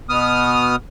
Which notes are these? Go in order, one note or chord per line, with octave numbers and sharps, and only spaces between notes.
B2 B3 D#6 F6